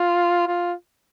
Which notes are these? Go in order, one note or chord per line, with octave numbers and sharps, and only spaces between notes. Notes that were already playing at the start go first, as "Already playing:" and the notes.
Already playing: F4
F4